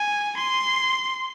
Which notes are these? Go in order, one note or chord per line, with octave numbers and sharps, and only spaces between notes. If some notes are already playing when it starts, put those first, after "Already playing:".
Already playing: G#5
C6